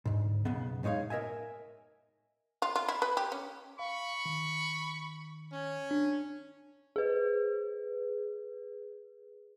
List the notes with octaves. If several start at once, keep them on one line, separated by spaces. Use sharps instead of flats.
D2 G#2
B1 F#2 C#3 B3
A2 G#3 D#4 C#5 F5
A#4 D#5 E5 G#5
F4
F4
E4
B4
G4
C#4
F5 B5 C#6
D#3
C#4
D4
G#4 B4